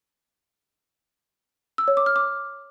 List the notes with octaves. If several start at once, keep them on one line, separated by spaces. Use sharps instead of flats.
E6
C#5
D6
F6
D6